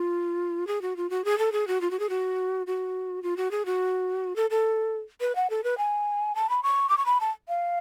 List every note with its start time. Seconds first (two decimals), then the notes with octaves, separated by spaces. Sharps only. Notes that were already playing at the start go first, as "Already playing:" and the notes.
Already playing: F4
0.67 G#4
0.82 F#4
0.96 F4
1.10 F#4
1.25 G#4
1.38 A4
1.52 G#4
1.67 F#4
1.81 F4
1.91 F#4
1.99 G#4
2.09 F#4
2.67 F#4
3.23 F4
3.37 F#4
3.51 G#4
3.65 F#4
4.36 A4
4.50 A4
5.21 B4
5.36 F#5
5.50 A4
5.64 B4
5.78 G#5
6.35 A5
6.50 B5
6.63 C#6
6.89 D6
6.97 C#6
7.06 B5
7.20 A5
7.48 F5